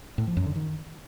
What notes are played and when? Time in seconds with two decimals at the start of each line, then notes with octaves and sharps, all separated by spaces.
0.18 A2
0.27 F3
0.37 F#2
0.46 D3
0.56 D#3